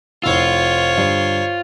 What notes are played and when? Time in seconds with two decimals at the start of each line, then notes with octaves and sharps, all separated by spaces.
0.24 F1 E4 F4 C5 C#5 E6
0.97 G2 D3